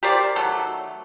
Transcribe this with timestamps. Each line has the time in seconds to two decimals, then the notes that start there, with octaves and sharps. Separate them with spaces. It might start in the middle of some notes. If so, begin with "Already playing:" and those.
0.03 G4 A#4 C5 D5
0.36 D#3 F#3 A3